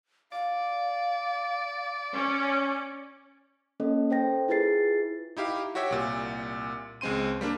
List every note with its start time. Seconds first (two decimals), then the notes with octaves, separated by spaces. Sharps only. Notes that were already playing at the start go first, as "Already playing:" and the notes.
0.32 D5 F5
2.13 C#4
3.80 A#3 C#4 A4 D#5
4.10 A4 C5 G5 A#6
4.48 E4 F4 G#4 B4 A6 C7
5.37 D#4 E4 G4 F5
5.75 F#4 G4 C#5 E5 G5
5.91 C2 A#2
7.01 C#2 G#3 C4 C6 D#7
7.41 G3 A#3 D4